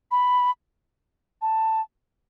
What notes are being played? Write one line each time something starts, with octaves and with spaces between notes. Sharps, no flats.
B5
A5